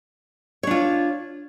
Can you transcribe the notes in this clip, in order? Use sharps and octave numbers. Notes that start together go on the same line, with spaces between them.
D4 F4 C#5